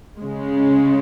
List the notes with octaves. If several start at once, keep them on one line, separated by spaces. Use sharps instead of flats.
C#3 G#3